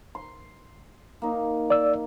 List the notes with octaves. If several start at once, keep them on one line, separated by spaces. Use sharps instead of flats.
C6
A#3 D#4
D5 E6